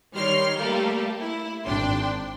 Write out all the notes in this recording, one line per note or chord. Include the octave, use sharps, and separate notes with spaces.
D#3 G3 C#5 C6 F6
G3 A3 A#3 G4 A4
E4
G#1 D4 G5 C6